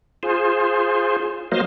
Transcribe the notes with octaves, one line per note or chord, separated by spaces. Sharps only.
F4 G#4 C5
F#3 A#3 C5 D#5 F5